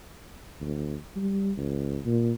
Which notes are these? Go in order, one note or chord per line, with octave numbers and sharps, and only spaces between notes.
D2
G3
C#2
A#2